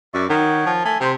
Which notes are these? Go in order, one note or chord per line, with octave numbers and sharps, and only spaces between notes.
F#2 D5 E5 C#6
D#3 C#5 F#5 G5
F3
A3 G#5
C3 C4